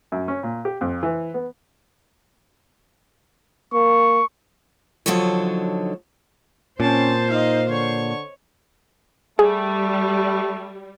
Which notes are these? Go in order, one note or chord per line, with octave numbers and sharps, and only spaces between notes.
F#2
C#4
A#2
G4
F2
E3
B3
A#3 C#6
D3 F3 F#3 D#4 A4 C#5
A#2 C4 C#4 C5 A5
D#4 D#5 F5
D3 C#5 C#6
G3 A3 G#4